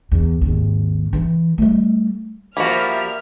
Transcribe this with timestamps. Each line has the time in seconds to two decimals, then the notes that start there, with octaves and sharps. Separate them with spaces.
0.11 E2
0.41 G#1 D#2
1.13 E3
1.58 G3 A3
2.57 F3 G3 A#3 F#4 A#4 E5 B5 F6